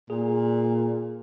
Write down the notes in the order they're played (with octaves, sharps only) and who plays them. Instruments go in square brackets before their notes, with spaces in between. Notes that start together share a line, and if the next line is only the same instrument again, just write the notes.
[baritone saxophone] A#2 [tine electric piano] G#4